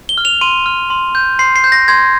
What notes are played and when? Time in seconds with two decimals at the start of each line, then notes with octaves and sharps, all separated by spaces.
0.09 G7
0.18 F6
0.25 F7
0.41 C6 D#7
0.66 F6
0.90 C6
1.15 G6
1.39 C6 C7
1.56 C7
1.64 G6
1.72 A#6
1.88 C6 G#6